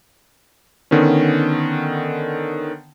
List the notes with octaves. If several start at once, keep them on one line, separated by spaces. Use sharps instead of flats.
D3 D#3 B3 C#4